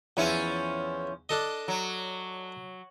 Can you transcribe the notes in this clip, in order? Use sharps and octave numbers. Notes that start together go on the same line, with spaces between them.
E2 F3 C#4 E4
D4 A4 D#5
F#3